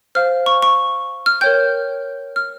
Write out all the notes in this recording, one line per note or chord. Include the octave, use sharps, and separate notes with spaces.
C5 F5 F6
C#6
C#6
F6
A#4 C#5 G5 G6
F6